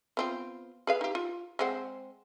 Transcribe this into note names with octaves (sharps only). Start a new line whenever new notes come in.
B3 C4 F4
G#4 B4 F5
D#4 G4
F4
G#3 C4 F#5